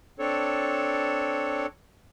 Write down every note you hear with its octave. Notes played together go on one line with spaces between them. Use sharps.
C4 D4 A4 C#5